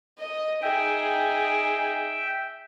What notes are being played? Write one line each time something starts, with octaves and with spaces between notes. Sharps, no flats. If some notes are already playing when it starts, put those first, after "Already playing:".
D#5
D#4 G#4 E5 G5